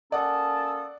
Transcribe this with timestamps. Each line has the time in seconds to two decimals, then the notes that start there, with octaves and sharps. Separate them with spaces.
0.12 A#3 C#4 A4 D5 F#5 A5 D#6